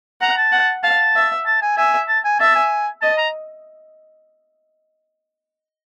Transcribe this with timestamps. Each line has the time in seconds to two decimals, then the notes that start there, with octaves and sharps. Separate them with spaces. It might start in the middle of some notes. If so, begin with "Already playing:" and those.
0.21 F#5 A#5
0.38 A5
0.52 F#5
0.83 F5 A5
1.16 E5
1.46 A5
1.62 G#5
1.77 E5 G#5
2.08 A5
2.25 G#5
2.40 E5 A5
2.55 G#5
3.02 D#5 A5
3.18 A#5